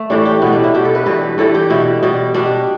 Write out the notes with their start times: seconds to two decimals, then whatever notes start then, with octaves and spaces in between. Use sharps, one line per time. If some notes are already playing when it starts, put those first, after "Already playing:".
Already playing: A3
0.10 A2 E3 G3 D4
0.25 G4
0.42 B2 G3 B3
0.52 D4
0.64 E4
0.74 B2 G3 G4
0.85 A4
0.95 B4
1.06 G2 E3 G3 B4
1.38 G2 E3 G3 A4
1.54 G4
1.70 B2 G3 E4
2.03 B2 G3
2.34 B2 G3 D4